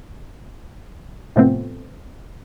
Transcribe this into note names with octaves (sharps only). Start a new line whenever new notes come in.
A2 C3 F3 A3 B3 C4